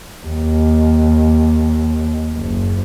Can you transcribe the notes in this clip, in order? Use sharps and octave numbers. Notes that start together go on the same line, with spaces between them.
D#2
F#1